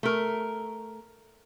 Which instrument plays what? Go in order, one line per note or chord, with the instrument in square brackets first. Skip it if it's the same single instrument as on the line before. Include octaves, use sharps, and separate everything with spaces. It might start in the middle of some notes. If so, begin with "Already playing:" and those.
[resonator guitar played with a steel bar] A3 A#4